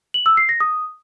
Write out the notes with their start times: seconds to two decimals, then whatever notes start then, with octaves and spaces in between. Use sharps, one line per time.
0.14 F#7
0.26 E6
0.37 C7
0.49 A#6
0.60 D#6